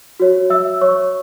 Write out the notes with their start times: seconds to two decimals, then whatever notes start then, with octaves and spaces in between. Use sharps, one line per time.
0.20 F#4 C#5
0.50 E5 E6
0.81 C#5 C#6